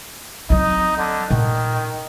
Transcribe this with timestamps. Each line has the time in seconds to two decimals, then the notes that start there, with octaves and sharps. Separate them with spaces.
0.50 F#3 C4 D#4
0.98 D3
1.31 A#2 D#3